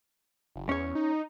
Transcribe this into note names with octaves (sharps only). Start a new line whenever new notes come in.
F#1
E2 C#4 C#5
D#4